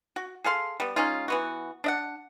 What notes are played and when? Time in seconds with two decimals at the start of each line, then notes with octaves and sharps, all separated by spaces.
0.16 F#4
0.44 G#4 A4 F5 C6
0.80 G3 B3
0.96 G#3 C#4 D#4 F4
1.28 E3 B3 F#4
1.84 D4 D#5 F#5